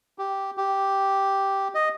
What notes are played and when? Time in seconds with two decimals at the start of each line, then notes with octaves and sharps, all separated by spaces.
0.18 G4
0.57 G4
1.75 D#5